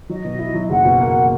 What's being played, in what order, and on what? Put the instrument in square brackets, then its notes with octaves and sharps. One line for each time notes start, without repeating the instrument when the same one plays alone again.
[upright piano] F#3 [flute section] D#5
[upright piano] B2
E4
F#3
[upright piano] F#1 [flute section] F#5
[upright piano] B2
A#3